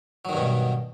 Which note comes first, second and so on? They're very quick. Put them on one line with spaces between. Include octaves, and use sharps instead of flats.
F#3 D#3 G2 B2